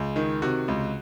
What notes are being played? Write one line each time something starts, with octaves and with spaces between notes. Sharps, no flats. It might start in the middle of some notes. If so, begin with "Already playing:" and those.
Already playing: C#2 G#4
D#3
C3 F#4
C#2